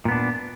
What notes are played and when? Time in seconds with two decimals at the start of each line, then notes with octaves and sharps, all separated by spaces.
0.05 A#2
0.08 B3
0.12 D4